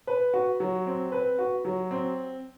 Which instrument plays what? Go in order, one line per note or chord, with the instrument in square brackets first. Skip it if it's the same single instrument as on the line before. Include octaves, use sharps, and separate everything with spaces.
[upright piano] B4
F#4
F#3
C4
B4
F#4
F#3
C4